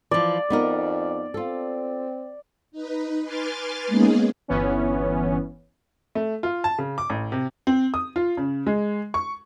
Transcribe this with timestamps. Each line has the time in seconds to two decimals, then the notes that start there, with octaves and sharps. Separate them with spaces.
0.11 E3 F3 D5
0.50 F2 B3 D#4 A#4
1.34 C4 F4 A4
2.72 D#4 B4
3.23 B4 G#5 C6 D6 F6 A6
3.87 G#3 A#3 B3 C#4 D#4 G#4
4.48 G1 E3 B3 C#4
6.15 A3
6.43 F4
6.64 A5
6.78 C#3
6.98 D6
7.10 A1
7.32 C3
7.67 C4
7.94 D#6
8.16 F4
8.37 C#3
8.67 G#3
9.14 C#6